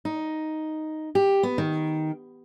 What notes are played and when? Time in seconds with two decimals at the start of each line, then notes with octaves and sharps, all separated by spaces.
0.05 D#4
1.15 G4
1.43 B3
1.58 D#3